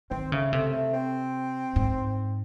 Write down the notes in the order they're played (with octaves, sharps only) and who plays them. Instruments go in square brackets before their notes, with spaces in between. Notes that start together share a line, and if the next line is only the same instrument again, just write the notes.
[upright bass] D#3 [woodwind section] C4
[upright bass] C#3 [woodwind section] A3
[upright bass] C3 [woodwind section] A3
[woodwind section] A3
C4
[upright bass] G#2